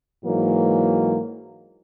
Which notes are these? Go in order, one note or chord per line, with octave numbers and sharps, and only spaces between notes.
G#2 E3 F#3 A#3